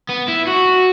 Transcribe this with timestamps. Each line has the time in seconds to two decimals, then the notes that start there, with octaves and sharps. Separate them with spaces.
0.10 B3
0.29 E4
0.48 F#4